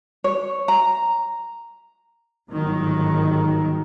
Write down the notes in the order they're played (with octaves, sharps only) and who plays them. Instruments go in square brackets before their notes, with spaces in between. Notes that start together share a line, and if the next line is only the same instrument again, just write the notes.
[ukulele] C#5
A#5
[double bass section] G1 G#2 D#3 F#3